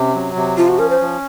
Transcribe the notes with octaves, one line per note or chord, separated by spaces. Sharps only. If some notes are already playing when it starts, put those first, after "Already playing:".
Already playing: C3 C#4
F#3
C3
F3 F4
F#4
C#4 A#4
C5
F3